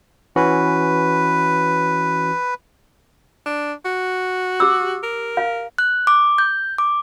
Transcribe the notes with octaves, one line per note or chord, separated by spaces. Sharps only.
E3 C#4 F#4 B4
D4
F#4
G4 D6 E6
A#4
F5
F#6
D6
G6
D6